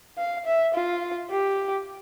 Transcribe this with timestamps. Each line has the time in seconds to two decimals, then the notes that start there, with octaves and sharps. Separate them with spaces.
0.18 F5
0.46 E5
0.74 F4
1.31 G4